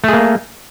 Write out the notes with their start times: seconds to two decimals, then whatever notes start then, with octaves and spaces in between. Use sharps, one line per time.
0.04 A3
0.08 G#4
0.13 A#3